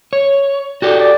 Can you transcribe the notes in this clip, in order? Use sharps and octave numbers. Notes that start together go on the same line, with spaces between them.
C#5
F#4 G4 A4 D5
D5